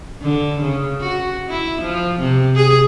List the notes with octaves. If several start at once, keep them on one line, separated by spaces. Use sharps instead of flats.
D3
C#3
F#4
E4
F3
C3
G#4